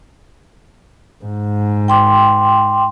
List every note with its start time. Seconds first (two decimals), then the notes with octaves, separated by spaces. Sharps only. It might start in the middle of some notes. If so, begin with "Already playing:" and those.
1.25 G#2
1.88 G5 C6 D6